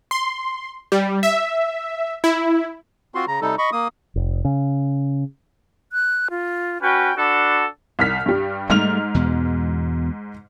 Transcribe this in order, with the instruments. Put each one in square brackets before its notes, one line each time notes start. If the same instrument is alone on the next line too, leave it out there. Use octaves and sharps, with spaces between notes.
[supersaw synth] C6
G3
E5
E4
[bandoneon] C4 F4 F#4 C6
C#3 A#5
C3 G3 D#4 A4
D#5 B5 C#6
A#3 D#6
[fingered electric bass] F1
C#3
[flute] F#6
F4
[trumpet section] C#4 B4 G5 [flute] F#4
[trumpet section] D4 F#4 A4 [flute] B5
[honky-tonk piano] C2 F6 B6
G2 G3
[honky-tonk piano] G#2 F6 F7 [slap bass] G3 A3
[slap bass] E2 B2